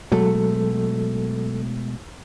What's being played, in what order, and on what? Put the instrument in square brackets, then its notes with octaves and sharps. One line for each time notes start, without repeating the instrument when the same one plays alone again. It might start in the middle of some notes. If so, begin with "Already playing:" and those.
[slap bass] B2 G#3 A3 [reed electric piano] F#3 A4